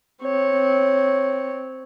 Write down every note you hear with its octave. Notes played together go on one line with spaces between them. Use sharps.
C4 C#5